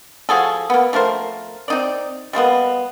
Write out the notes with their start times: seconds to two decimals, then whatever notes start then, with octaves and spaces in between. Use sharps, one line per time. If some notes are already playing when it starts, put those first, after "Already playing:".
0.29 F3 F#4 G#4 A4
0.70 A#3 B3
0.93 F3 A3 A#4 C5
1.68 C4 D#4 D5
2.33 G3 G#3 A#3 B3